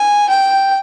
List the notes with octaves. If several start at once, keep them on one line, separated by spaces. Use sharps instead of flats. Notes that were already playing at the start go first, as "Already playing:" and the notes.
Already playing: G#5
G5